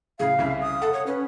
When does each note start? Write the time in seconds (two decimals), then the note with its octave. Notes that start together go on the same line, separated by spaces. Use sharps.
0.20 A2 C#3 G#4 F5
0.38 C2 C#3 E5
0.61 D#6
0.82 A4 F#5
0.93 C#5
1.06 C#4 B4